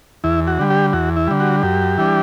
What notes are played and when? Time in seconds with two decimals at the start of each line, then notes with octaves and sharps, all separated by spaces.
0.24 E2 E4
0.47 F#4
0.59 D3 G3
0.70 G4
0.93 E2 F#4
1.16 E4
1.27 D3 G3
1.40 F#4
1.63 F#2 G4
1.98 E3 G3 D4